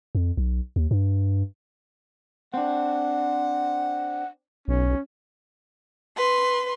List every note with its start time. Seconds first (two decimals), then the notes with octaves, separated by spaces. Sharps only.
0.15 F2
0.37 B1
0.76 D#2
0.91 G2
2.54 C4 D4 F#5
4.68 B1 C#4
6.17 B4 C6